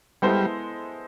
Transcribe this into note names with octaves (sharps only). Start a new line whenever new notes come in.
G3 G#3 B3 E4 A4 C5